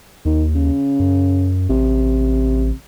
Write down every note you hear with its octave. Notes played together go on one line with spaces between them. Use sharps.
D#2 D#3
C#3
F#2
A1 C3